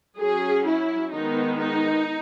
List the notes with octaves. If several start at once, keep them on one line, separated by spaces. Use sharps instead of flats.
F#3 C#4 G#4
E4
D#3 G#3 B3 D#4
D#4